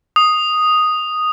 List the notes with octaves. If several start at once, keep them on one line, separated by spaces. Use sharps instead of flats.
D#6